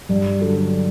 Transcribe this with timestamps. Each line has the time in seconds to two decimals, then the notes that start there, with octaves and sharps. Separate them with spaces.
0.09 G2
0.41 D3 F#3